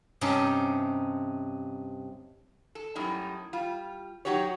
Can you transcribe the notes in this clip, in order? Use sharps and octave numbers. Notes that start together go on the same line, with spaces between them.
G2 C3 C4 C#4 D#4
A4
F#2 A2 G3 D#4
G3 F4
F#3 D#4 F#4 G4 C#5